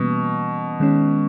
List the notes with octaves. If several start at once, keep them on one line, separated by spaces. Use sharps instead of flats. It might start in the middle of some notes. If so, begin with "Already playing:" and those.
Already playing: B2 E3 G3 A#3 C#4
D#3 G#3 C#4